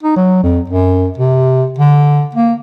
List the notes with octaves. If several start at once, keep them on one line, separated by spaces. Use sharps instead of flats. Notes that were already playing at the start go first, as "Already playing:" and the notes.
D#4
F#3
F2
F#2
C3
D3
A#3